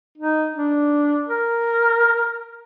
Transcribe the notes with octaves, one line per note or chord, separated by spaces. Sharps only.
D#4
D4
A#4